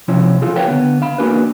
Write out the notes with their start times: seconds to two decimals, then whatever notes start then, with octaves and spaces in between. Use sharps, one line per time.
0.08 C3 F3 C#4 E4 C#5
0.42 F4 G#4 A4 F5
0.56 F#4 A#4 B4 C#5 F5 G5
0.68 D3 B3
1.02 F5 B5
1.18 A#3 D4 F#4 G#4 A#4 B4